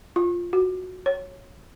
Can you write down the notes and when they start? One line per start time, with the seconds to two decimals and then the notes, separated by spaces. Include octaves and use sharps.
0.16 F4
0.53 F#4
1.06 C#5